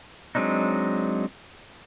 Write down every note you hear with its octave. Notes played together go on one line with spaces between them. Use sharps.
F#3 G#3 C4 D4 D#4